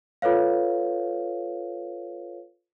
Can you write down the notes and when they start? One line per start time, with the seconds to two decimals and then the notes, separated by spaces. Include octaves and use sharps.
0.22 F4 A4 B4 C#5 F5